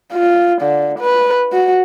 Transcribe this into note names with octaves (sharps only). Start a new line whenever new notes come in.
F4
D3
B4
F#4